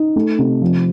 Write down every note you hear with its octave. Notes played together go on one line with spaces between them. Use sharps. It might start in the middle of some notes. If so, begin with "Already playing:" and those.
Already playing: D#4
A3
C3
F3